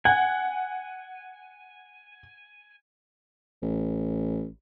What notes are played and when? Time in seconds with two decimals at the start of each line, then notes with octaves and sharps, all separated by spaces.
0.05 F#5 G#5
3.63 A1